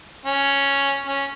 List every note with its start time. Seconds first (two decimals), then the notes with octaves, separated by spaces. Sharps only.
0.26 C#4
1.06 C#4